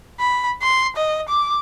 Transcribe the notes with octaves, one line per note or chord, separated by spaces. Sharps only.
B5
C6
D#5
D6